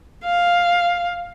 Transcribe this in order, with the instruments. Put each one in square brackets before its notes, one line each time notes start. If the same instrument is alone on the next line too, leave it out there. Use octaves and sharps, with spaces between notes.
[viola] F5